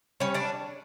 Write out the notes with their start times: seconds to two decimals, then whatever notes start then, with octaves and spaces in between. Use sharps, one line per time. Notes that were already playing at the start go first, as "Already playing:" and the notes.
0.20 G3 C#4 C#5
0.34 D4 D5